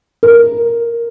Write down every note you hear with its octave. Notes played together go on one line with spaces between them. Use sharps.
A#4